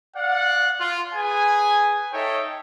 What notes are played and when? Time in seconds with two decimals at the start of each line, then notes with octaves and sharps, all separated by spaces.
0.16 D5 F5 F#5
0.80 F4
1.15 G#4 B4 G#5
2.13 D#4 A4 C#5 E5 G5